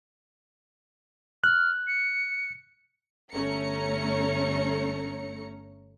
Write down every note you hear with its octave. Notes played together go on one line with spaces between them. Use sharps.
F6 F#6
C#7
G1 A3 C#4 C#5 A#5 C#7